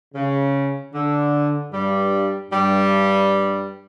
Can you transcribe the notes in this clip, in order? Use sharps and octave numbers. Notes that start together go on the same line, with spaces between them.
C#3
D3
G2 G3
G2 G3